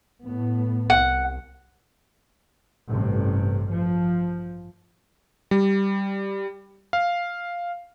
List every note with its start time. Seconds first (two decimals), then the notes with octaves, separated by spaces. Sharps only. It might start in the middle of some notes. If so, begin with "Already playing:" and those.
0.25 A2 B3
0.90 C2 F#5
2.88 A1 G2 C3
3.71 F3
5.51 G3
6.93 F5